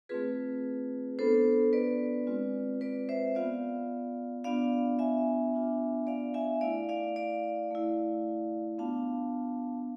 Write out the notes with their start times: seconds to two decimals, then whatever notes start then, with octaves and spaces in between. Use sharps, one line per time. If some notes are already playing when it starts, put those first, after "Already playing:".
0.09 A3 C4 F4 G#4 B4
1.19 B3 D4 F4 A4 C5
1.73 B4 D5
2.27 G#3 C4 F4
2.81 B4 D5
3.09 C5 E5
3.35 B3 F4 D5 F5
4.44 B3 D4 F4 D5 F5
4.99 E5 G#5
5.53 B3 D4 F4
6.07 D5 F5
6.34 E5 G#5
6.61 A3 E4 D5 F5
6.89 D5 F5
7.16 D5 F5
7.71 A3 E4
8.78 B3 D4 F4 F5 A5